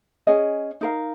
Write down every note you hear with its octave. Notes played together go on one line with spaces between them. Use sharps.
C#4 G#4 D#5
D#4 A#4 F5